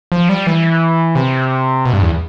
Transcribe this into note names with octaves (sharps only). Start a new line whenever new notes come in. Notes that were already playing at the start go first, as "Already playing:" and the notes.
F3
G3
E3
C3
B2
G2
E2